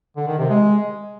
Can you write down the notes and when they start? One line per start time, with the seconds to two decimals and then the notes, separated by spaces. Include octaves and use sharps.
0.17 D3
0.28 D#3
0.39 C3
0.50 G#3